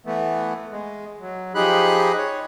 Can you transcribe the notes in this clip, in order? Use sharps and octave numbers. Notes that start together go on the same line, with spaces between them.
E3 A3 B3
G#3
F#3
F3 D#4 G4 G#4 B5 F#6
C#5